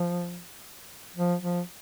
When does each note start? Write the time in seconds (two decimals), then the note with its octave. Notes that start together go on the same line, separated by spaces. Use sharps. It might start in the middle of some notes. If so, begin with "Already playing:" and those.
Already playing: F3
1.16 F3
1.42 F3